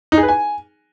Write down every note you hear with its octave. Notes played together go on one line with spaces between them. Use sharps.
D#4
G#4
B4
G#5